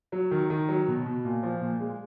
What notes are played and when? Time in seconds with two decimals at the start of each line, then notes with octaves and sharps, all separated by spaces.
0.12 F#3
0.31 D#3
0.50 D#3
0.69 F#3
0.88 B2
1.06 B2
1.25 A#2
1.43 F3
1.61 A#2
1.80 G#3